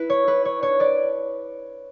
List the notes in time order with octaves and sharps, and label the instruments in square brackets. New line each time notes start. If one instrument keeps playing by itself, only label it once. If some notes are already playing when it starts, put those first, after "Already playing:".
Already playing: [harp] E4 B4
C#5
E4 B4
C#5
D4 C#5
B4 D5